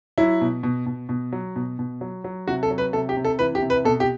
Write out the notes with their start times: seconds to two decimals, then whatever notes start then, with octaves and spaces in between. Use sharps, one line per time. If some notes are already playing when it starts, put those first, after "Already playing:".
0.18 F#3 E4
0.41 B2
0.63 B2
0.86 B2
1.09 B2
1.32 F#3
1.56 B2
1.79 B2
2.01 F#3
2.24 F#3
2.47 C3 F#4
2.63 A4
2.71 F#3
2.78 B4
2.93 C3 A4
3.09 G4
3.17 C3
3.25 A4
3.39 E3 B4
3.55 G4
3.62 C3
3.70 B4
3.85 B2 A4
4.00 G4